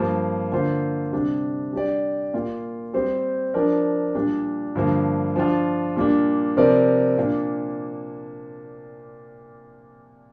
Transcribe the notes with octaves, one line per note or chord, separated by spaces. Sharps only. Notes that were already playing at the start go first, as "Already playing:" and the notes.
Already playing: G2 F3 A#3
D3 A#3 F4 C5
C3 G3 D4
G3 D4 G4 D5
A#2 A#3 F4
G3 C4 G4 C5
F3 D4 A#4 D5
A#2 G3 D4
G2 D3 F3 A#3
F3 D4 F4
A#2 G3 A#3 D4
C3 F3 C4 A#4 D5
A#2 A#3 D4